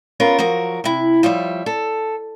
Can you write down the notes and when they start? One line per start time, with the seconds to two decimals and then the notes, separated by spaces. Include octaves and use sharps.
0.20 B3 C#4 F4 A#4 C#5
0.39 F3 F#3 F#4 A#4
0.84 C3 E4
1.23 F3 G3 C#5 E5
1.66 A4